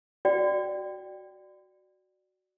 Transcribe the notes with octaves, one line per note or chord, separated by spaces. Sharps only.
F#4 D5 G5